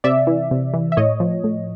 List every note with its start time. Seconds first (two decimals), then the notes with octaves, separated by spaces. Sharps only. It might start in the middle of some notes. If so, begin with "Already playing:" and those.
0.04 C3 D5 E5
0.27 E3
0.51 C3
0.74 E3
0.92 E5
0.97 A2 C#5 D#5
1.20 F3
1.44 A2